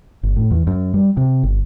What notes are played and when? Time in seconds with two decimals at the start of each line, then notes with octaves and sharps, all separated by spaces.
0.23 G1
0.36 A2
0.51 E2
0.67 F#2
0.94 G3
1.17 C3
1.43 G1